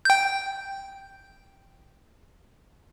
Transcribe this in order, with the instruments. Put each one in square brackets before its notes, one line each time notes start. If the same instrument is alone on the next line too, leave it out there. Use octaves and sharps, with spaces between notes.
[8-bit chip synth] G5 G6